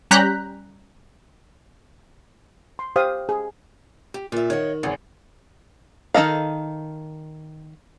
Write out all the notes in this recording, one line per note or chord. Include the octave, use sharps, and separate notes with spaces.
G3 C#4 A#5 F#6 G6 B6
C6
G4 C5 F5 D#6
G#4
G4
A#2 F4 E5
D#3 C#5 D#5 F#5
G#1 C#3 E3 G#4
D#3 C#4 A4 D#5 F5